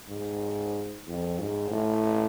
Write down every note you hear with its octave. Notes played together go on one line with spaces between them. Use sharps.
G#2
F2
G#2
A2